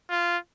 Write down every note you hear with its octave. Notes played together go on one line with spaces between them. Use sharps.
F4